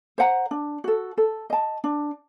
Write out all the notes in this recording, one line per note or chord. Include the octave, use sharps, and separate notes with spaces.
C5 F#5 A#5
D4
F#4 A4
A4
D#5 A5
D4